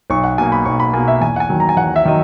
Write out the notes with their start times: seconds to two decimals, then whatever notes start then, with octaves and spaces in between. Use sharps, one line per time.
0.10 B1 C#6
0.24 F#5
0.38 B2 A#3 G#5
0.52 B5
0.65 B1 C#6
0.80 B5
0.93 B2 A#3 G#5
1.08 E5
1.21 E2 G#5
1.36 F#5
1.40 G#5
1.49 D#3 F#3
1.60 A#5
1.69 G#5
1.77 E2 F#5
1.96 E5
2.05 D#3 F#3 D#5